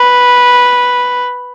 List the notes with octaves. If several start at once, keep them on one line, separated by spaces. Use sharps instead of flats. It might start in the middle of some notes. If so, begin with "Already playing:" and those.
Already playing: B4